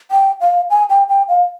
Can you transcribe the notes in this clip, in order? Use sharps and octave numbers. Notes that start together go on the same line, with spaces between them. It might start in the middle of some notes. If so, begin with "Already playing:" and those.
G5
F5
G#5
G5
G5
F5